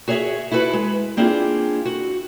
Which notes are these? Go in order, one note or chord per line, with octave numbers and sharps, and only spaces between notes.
F#4 G#4 C#5 D#5 E5
E4 F#4 A4 B4
G#3
A#3 C4 D4 E4 F4 G#4
F#4